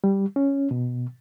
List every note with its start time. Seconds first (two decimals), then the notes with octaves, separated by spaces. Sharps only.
0.04 G3
0.36 C#4
0.71 B2